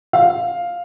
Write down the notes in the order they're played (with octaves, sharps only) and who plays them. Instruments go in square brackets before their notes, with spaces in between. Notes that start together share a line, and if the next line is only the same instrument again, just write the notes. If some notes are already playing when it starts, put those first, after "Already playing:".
[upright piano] F5